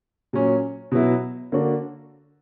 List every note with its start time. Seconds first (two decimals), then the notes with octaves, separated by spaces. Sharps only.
0.33 A#2 F#3 C#4
0.92 B2 F#3 B3 E4
1.52 D3 A#3 D4 F#4